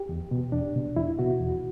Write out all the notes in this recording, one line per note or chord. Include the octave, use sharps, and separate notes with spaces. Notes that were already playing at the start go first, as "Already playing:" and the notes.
Already playing: G4
E2
B2
E2 D4
B2
E2 E4
B2 F#4
E2